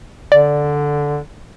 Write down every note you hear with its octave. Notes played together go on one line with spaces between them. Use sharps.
D3 D5